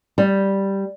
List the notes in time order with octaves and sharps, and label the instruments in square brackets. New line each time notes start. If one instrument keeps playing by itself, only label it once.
[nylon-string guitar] G3